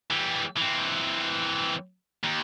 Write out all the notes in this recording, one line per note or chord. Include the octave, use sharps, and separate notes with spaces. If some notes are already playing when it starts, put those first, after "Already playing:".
E3 G3
E3 C4
D#2